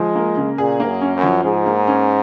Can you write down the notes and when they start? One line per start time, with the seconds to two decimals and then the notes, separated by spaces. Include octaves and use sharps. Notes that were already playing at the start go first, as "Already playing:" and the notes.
Already playing: F3 G#3
0.15 A#3
0.37 C#3
0.58 A#2 G#4
0.80 A#3
0.87 F#2
1.01 C#4
1.16 F#2
1.23 F3
1.44 G#2 G#4
1.66 A#3
1.87 C#4